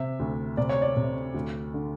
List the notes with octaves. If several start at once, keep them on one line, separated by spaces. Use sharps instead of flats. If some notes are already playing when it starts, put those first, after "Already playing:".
Already playing: C3 E5
D2
C3 D5
C#5
D5
C3
D2
D3